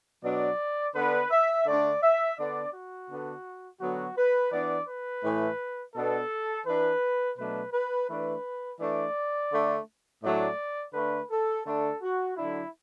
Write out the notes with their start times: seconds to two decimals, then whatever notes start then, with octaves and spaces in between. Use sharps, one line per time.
0.25 B2 F#3 D4 D5
0.95 D3 B3 D4 B4
1.31 E5
1.66 D3 A3 D4 D5
2.03 E5
2.38 D3 B3 D4 D5
2.74 F#4
3.09 D3 B3 D4
3.80 D3 F#3 B3 F#4
4.17 B4
4.52 E3 B3 D4 D5
4.88 B4
5.24 A2 E3 A3
5.95 B2 B3 D4 A4
6.66 E3 D4 B4
7.38 B2 F#3 A3 D4 B4
7.73 B4
8.09 E3 A3 D4 B4
8.80 E3 A3 D4 D5
9.52 D3 A3 D4
10.23 A2 F#3 A3 D4 D5
10.94 D3 A3 D4 B4
11.31 A4
11.66 D3 A3 D4 A4
12.02 F#4
12.37 D3 F#3 D4 E4